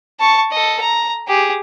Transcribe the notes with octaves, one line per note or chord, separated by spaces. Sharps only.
A5 C#6
A4 D#5
A#5
G4 G#4